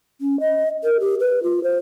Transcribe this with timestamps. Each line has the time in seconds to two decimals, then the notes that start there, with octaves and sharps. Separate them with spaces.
0.21 C#4
0.40 D#5
0.84 A#4
1.00 G4
1.20 B4
1.43 F4
1.63 C5